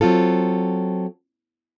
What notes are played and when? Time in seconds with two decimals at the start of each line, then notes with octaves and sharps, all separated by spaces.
0.01 F#3 C4 F4 A4